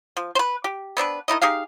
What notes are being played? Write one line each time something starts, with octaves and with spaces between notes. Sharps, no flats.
F3
B4 C5
G4
B3 C4 D4 B4
D#3 D#4 E4 D#5
D#4 G4 G#4 F5